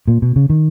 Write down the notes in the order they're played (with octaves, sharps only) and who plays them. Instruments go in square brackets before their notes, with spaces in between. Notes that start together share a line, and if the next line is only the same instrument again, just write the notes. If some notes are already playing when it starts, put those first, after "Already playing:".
[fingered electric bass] A#2
B2
C#3
D#3